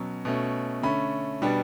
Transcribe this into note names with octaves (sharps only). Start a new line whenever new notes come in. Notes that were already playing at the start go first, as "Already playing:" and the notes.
Already playing: B2 F#3 C#4
B2 A3 C#4
D3 A3 C#4 B5
B2 G3 B3 D4